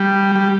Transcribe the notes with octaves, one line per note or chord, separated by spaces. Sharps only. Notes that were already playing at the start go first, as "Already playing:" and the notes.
Already playing: G3
G3